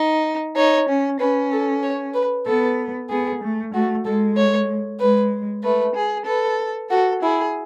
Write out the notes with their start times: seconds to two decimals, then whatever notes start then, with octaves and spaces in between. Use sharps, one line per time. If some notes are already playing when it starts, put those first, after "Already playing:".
Already playing: D#4
0.56 D#4 C#5
0.88 C#4
1.20 C#4 B4
1.52 A4
1.83 C#5
2.14 B4
2.46 B3 A4
3.10 B3 G#4
3.42 A3
3.73 A3 F#4
4.05 G#3 A4
4.37 C#5
5.00 G#3 B4
5.63 A3 B4
5.95 G#4
6.27 A4 B4
6.91 F#4 A4
7.22 E4 G#4